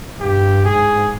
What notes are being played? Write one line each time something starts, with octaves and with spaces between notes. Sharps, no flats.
G2 G4
G#2 G#4